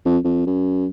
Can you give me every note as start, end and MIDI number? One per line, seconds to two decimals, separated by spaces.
0.05 0.18 41
0.24 0.44 41
0.47 0.86 42